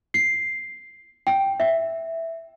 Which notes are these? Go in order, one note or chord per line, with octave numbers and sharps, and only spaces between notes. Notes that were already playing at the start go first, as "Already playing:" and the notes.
C7
G5
E5